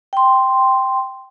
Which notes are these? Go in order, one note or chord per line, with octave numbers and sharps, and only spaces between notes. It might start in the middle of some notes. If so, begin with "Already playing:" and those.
G5 C6